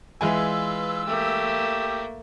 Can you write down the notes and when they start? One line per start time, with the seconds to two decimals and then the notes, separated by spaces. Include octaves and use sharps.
0.21 E3 G#3 F4 B4 G#5 E6
1.06 A3 A#3 G4